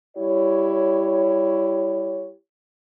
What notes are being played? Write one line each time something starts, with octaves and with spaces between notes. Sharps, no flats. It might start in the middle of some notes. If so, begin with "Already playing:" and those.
G3 E4 G4 C#5